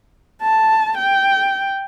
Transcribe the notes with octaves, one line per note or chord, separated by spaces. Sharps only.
A5
G5